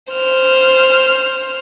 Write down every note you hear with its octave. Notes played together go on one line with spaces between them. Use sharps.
C5 F6